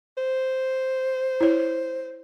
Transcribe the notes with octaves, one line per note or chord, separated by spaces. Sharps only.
C5
E4 C#5